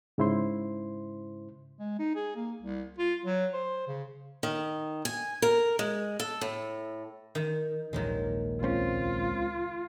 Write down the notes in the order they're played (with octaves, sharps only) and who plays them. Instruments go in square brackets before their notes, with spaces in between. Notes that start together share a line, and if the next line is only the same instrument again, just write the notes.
[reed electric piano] G#2 C#3 E4 C5 C6
[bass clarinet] G#3
D#4
G#4
A#3
C2
F4
F#3
C5
C#3
[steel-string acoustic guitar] D#3
G#5
A#4
G#3
A4
A2
[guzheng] D#3
[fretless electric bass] A#1 D#2 G#2 [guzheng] D#3 F#3 G#3
[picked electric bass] C#2 C4 C#4 [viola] F4